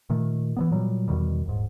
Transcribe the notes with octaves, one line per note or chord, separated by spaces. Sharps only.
A#2 D#3 A3
E3 F#3 B3
A#2 F#3 G3
E2 B2 D#3 G3
D#1 G#2